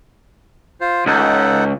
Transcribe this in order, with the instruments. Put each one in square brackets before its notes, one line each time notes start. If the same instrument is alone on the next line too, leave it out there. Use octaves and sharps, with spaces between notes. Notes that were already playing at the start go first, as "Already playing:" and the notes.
[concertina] F4 C5
[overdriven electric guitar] C#2 [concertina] D#4 A4 F#5